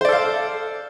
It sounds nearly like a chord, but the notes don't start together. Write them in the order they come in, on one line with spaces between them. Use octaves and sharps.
C5 D5 A4 F5